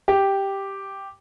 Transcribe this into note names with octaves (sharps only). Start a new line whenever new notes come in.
G4